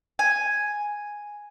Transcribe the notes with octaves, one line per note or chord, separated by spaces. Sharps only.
G#5